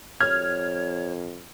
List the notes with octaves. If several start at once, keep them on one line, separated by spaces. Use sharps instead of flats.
F2 C#5 F6 G#6